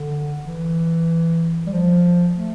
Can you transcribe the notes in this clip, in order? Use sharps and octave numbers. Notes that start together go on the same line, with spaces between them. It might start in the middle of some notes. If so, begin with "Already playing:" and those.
Already playing: D3
E3
G3
F3
A3